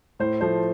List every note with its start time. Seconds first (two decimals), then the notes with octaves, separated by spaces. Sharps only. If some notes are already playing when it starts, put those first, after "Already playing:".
0.19 A2 C5
0.41 F3 A3 C5